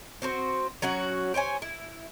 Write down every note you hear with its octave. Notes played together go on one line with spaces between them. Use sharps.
C4 F#4 A4 C5
F#3 C#4 F#4 F#5
G4 C5 C#5 G#5
E4